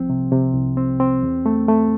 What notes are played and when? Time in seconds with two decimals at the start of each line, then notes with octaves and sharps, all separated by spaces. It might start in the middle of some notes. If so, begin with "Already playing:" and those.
Already playing: C2 F3 C4
0.10 C3
0.32 C3
0.55 C2
0.77 C4
1.00 C4
1.23 E2
1.46 A3
1.68 A3